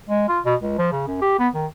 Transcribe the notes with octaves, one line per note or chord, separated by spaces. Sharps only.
G#3
F4
B2
C#2
F3
C#3
F#2
G4
B3
D#3